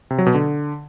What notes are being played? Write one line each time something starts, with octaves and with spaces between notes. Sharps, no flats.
C3
F#3
B2
D3